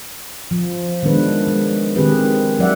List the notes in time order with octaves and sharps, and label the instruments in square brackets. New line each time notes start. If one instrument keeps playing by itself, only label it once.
[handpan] F3
D#3 G#3 B3 D4 B4
G#3
D#3 G#3 C4 G4 G#4 B4
F#3 F4 D5 E5 F#5